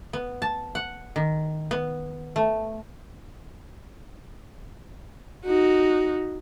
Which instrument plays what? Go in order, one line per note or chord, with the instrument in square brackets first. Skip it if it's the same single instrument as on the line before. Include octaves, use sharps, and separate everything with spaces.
[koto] B3
A5
F#5
D#3
B3
A3
[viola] D#4 F#4